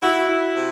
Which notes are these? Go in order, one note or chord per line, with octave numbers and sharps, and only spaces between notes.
E4 F#4
E4
C3